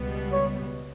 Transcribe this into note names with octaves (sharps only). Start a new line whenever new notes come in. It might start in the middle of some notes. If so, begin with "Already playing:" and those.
Already playing: C#2 B2 G3 B3
C#5